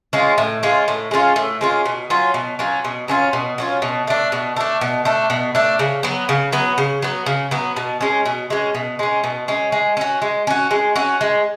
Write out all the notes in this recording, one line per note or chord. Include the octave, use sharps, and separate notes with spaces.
G#3 C#4 F4
A2
G#3 C#4 F4
A2
G#3 C#4 F4
A2
G#3 C#4 F4
B2
F#3 C#4 F4
B2
F#3 C#4 F4
B2
F#3 C#4 F4
B2
F#3 C#4 F4
B2
A3 D4
B2
A3 D4
B2
A3 D4
B2
A3 D4
C#3
F#3 B3
C#3
F#3 B3
C#3
F#3 B3
C#3
F#3 B3
B2
G#3 C#4
B2
G#3 C#4
B2
G#3 C#4
B2
G#3 C#4
G#3
C#4 F#4
G#3
C#4 F#4
G#3
C#4 F#4
G#3